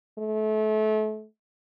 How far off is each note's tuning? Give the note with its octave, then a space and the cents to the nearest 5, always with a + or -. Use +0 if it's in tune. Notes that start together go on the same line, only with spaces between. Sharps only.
A3 -30